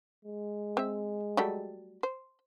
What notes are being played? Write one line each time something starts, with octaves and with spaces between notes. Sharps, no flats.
G#3
C4 E5
F#3 G3 A3
C5